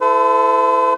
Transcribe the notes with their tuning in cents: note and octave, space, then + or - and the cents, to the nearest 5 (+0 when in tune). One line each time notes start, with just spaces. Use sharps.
E4 +15 A4 +0 C5 -45